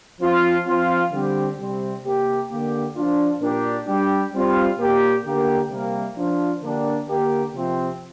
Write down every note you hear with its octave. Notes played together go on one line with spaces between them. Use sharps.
F3 C4 F4
F3 C4 F4
D3 G3 C4 G4
C3 G3 C4
C3 A#3 G4
D3 A#3 G4
F3 D4 F4
A#2 A#3 D4 G4
G3 D4 G4
G3 C4 F4
A#2 A#3 G4
D3 A#3 G4
C3 G3 A#3 G4
F3 D4 F4
D3 A#3 D4 G4
D3 A#3 G4
C3 F3 C4